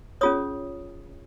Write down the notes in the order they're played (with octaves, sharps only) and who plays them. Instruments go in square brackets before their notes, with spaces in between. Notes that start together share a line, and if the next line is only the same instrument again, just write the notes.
[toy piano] C#4 F4 G#4 C#5 D#6